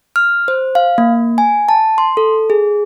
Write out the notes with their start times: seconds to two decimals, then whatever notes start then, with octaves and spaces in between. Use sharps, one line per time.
0.16 F6
0.48 C5
0.75 F5
0.98 A#3
1.38 G#5
1.69 A5
1.98 C6
2.17 A4
2.50 G#4